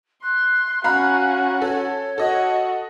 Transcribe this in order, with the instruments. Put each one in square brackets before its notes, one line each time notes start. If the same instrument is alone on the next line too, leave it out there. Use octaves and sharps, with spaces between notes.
[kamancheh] C6 [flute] F#6
[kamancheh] C#4 F#4 [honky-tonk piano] F5 A#5 B5
[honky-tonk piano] A4 [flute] C#5
[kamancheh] F#4 [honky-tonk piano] A4 D#5